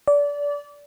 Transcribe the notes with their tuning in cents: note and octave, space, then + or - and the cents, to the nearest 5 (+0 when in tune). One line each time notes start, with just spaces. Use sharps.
D5 -25